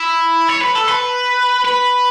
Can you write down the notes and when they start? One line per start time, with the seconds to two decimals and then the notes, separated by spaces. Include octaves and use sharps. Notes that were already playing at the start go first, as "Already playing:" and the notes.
Already playing: E4
0.49 C#5
0.62 B4
0.75 A4
0.88 B4
1.65 B4